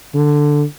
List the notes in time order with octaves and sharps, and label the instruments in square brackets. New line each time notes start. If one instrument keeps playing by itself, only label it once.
[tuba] D3